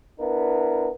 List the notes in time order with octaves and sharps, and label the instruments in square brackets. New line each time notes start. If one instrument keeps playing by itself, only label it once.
[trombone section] B3 D4 E4 A#4